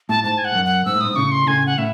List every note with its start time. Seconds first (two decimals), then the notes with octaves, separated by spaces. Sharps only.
0.09 A2 A5
0.24 G#2 A5
0.38 G#5
0.45 F#5
0.55 F#2
0.65 F#5
0.85 G#2 E6
0.95 A2
1.01 G#2 D#6
1.16 A2 C#3 C#6
1.32 C6
1.47 A2 C#3 G#5
1.66 F#5
1.78 A2 E5